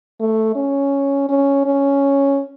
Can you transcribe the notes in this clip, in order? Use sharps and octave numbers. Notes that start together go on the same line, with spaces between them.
A3
C#4
C#4
C#4